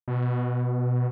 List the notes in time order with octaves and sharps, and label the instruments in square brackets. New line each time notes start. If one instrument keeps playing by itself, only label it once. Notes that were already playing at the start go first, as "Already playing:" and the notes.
[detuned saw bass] B2